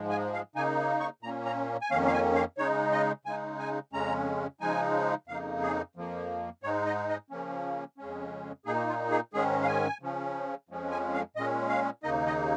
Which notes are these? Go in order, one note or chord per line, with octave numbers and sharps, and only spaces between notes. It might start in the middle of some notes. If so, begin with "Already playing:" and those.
Already playing: G#2 F3 G#3
G#5
F5
C#3 A#3 D#4 G#5
C#6
A#2 A#3 C#4 A#5
A#5
G#5
F2 D#3 A#3 C#4 F5
F5
G#5
F5
C#3 G#3 D#4 C#5
D#5
C#3 G#3 D#4 G#5
G#5
F2 C#3 G#3 C#4 A#5
C#3 F3 G#3 D#4 G#5
F2 C#3 A#3 D#4 F5
G#4
F2 F3 A#3
G#2 G#3 D#4 C#5
D#5
D#5
C#3 F3 A#3 C#4
F2 C#3 G#3 C#4
A#2 A#3 D#4 G#4
F4
G#4
G#2 D#3 G#3 C#4 G#4
F5
G#5
C#3 F3 C#4
F2 F3 G#3 C#4
G#5
F5
A#2 G#3 C#4 D#5
F5
D#2 C#3 A#3 D#4 D#5
D#5